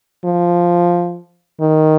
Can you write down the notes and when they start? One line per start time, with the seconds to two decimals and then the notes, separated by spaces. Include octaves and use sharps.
0.25 F3
1.61 D#3